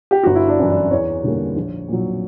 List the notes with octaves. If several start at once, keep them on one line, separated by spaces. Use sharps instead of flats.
G4
G1 F#4
E4
D4
F#2 E3
D4
E2 C#5
D3 G3 A#3
A#1
A#2 F#3